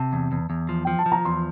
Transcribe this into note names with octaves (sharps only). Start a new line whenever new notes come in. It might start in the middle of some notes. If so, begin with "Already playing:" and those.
Already playing: C3 A5
E2
E2
E2
F3
F3 G5
A5
F3
A#5
E2 C6